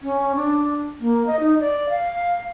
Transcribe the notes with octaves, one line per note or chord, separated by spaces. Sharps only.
C#4
D4
A#3
D#5
D#4
D5
F5